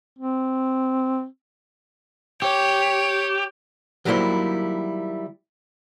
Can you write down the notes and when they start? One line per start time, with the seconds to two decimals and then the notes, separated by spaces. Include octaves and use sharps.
0.19 C4
2.42 G4 C#5
4.05 D#3 F#3 G3 A#3 E4 C5